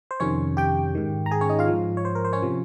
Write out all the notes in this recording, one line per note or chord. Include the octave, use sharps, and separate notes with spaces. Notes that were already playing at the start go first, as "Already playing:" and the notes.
C5
F2 C3 D#3 C#4 C#5
G4 G5
G#2 D#3
A#5
G#4 G#5
C#4 C#5
D#4 D#5
F4 F5
G#2 F3
C#5
C5
A#4
C5
C#4 C#5
C3 F3